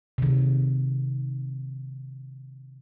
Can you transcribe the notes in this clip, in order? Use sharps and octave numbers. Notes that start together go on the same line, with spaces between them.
C3 D#3